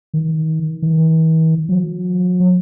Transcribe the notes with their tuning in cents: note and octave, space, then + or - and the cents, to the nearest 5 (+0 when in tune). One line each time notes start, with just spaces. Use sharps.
D#3 +30
E3 -45
F#3 -40